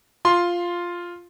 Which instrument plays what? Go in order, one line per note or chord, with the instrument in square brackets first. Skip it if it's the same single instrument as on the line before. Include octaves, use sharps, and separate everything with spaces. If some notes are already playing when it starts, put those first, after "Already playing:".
[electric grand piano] F4 C6